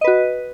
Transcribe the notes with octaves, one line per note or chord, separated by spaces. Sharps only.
F#4 B4 D#5